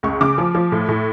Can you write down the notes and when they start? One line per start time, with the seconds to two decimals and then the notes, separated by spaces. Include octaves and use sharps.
0.03 C#2 C#6
0.21 C#3 D6
0.38 F3
0.55 F3
0.72 A2
0.89 A2